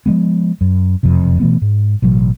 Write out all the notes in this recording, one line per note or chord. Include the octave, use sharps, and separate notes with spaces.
F3 F#3 G#3 B3
F#2
E1 F2 C3
B2 E3 A3 B3
G#2
A1 B2 F#3